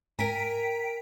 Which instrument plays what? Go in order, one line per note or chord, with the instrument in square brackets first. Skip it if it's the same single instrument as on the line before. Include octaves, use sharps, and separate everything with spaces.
[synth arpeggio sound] G#2 [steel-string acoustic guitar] A#4 G#5 [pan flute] G5 [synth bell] A#5 B6 D7